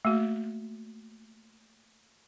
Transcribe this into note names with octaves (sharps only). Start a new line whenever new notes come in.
A3 A#3 F#4